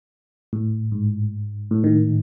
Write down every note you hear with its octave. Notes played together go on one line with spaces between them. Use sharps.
A2
G#2
A2
D#3